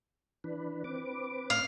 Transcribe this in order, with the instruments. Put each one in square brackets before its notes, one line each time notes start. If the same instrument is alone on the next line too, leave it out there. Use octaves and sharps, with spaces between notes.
[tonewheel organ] E3 D4 B4
C4 B4 D6
[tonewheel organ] A2 C#5 [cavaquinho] F5